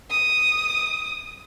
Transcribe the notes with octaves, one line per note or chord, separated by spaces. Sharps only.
D#6